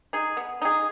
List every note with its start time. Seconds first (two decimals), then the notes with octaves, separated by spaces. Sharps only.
0.13 D#4 G#4
0.37 B3
0.62 D#4 G#4